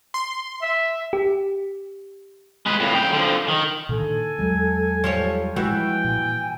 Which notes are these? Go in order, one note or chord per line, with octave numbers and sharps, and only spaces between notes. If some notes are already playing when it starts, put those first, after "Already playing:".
C6
E5
G4
G#3 B4
F2 A2
C#3 G5
D3 F3
D#3
A#2 D3 D#3 A4 G#5
E2 F#3 G#3
F3 G3 C#5
E3 F3 G#3 F#4 G5
A#2 G#5